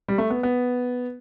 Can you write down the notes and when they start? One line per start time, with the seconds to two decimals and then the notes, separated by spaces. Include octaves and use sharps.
0.08 G3
0.18 A3
0.30 B3
0.43 B3